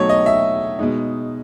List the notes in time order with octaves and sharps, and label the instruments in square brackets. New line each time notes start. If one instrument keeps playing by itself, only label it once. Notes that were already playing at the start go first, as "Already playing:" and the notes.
Already playing: [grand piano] B2 F#3 A3 D#4 C#5
D#5
E5
B2 G#3 D#4